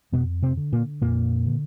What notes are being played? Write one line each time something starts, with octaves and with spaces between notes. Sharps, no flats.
F2 B2 B3
C3 C4
D3
A#2 A#3
F2 A#2 A#3
D3